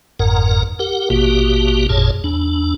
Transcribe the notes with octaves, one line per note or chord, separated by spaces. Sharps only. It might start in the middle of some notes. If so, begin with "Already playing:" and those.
G1 F2 G#2 A#4 F#5 A#5
G4 A#4 F#5
A1 B2 A#3 F#4 G4
G#1 F2 A#2 G#4 C#5 A5
E2 D4